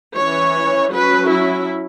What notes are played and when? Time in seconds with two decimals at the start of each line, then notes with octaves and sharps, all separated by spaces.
0.17 E3 C#4 C#5
0.93 F#3 C#4 B4
1.30 E4